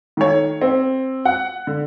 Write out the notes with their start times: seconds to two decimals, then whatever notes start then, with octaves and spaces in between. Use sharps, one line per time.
0.17 D#3 A3 C#5
0.62 C4
1.25 F#5 F#6
1.67 D3